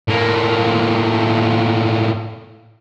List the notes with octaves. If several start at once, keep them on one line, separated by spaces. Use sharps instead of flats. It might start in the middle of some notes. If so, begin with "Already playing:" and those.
A2 A#3